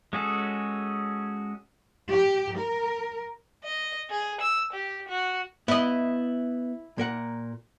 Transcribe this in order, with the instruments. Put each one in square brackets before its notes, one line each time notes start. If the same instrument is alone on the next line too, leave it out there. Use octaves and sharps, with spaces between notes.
[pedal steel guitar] G#3 C#4 F#4 G#4 A4
[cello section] G4
A#4
[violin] D#5
G#4
E6
G4
F#4
[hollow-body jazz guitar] B3 [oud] E4 D#5
[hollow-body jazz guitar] A#2 A#4 F#5